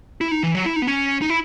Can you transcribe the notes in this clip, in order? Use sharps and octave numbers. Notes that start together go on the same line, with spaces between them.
E4
D#4
E3
F#3
E4
D#4
B3
C#4
D#4
E4